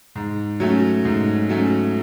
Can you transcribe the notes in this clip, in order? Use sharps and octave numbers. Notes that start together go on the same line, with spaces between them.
G#2
F#3 A3 C#4
G#2
F#3 A3 C#4